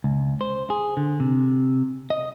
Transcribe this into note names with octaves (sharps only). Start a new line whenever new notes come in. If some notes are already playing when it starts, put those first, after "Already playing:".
C#2
C5
G#4
D3
C3
D#5